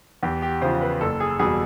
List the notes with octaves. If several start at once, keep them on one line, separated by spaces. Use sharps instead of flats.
E2 G4
G4
C#3 F3 C5
B4
F#1 A4
G#4
E2 B2 G3 G#4